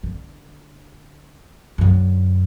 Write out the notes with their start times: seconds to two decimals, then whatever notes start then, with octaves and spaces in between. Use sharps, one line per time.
0.03 D3
1.78 F#2 D3